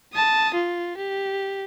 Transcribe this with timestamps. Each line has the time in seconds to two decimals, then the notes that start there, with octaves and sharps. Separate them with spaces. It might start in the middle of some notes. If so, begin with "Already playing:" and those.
0.14 A5 D#6
0.54 F4
0.98 G4